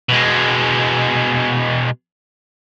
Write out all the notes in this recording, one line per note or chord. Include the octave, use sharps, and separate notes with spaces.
B2 G#3